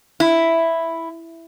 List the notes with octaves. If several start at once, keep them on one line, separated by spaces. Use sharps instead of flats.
E4